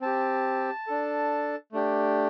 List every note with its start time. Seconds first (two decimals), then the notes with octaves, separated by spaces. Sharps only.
0.01 C4 G4 A5
0.87 D4 A4
1.72 A3 D4 G4